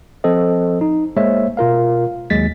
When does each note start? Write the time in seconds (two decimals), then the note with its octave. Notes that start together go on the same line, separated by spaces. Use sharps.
0.24 F3 C4 A4 C5 D#5
0.81 D#4
1.17 G#3 A#3 C5 C#5 E5
1.57 B2 F4 A#4 F5
2.30 D#2 F#3 G#3 A6 B6